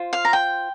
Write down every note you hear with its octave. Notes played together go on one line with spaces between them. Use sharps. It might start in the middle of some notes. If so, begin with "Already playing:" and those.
Already playing: F4 C5
F5
A#5
G5